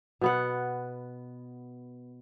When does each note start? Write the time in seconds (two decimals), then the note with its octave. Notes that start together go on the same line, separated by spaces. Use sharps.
0.21 B2 B3 F#5